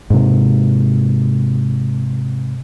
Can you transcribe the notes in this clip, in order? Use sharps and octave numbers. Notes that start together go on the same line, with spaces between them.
G#2 C3